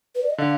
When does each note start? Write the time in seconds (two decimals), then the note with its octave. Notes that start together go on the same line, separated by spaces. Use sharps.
0.15 B4
0.23 D5
0.30 D#5
0.38 D3 F5